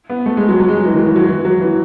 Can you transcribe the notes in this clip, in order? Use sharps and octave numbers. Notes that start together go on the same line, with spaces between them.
B3
A3
G#3
F#3
F#3
G#3
F#3
E3
D#3
E3
F#3
E3
F#3
E3